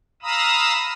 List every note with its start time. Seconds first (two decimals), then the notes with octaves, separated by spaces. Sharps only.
0.23 F5 A#5 B5 D#6 E6